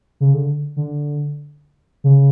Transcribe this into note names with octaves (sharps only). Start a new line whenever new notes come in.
C#3
D3
D3
C#3